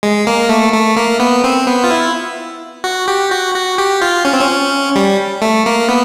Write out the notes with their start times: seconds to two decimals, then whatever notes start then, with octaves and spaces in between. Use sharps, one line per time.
0.03 G#3
0.27 A#3
0.49 A3
0.73 A3
0.96 A#3
1.20 B3
1.44 C4
1.67 B3
1.84 F4
1.91 E4
2.84 F#4
3.08 G4
3.31 F#4
3.55 F#4
3.78 G4
4.02 F4
4.25 C#4
4.33 C4
4.41 C#4
4.95 G3
5.42 A3
5.66 A#3
5.89 B3